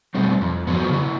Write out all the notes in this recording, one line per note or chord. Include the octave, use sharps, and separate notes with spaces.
B2 G3 A3 C4
F2
F3 F#3 B3
C#3 E4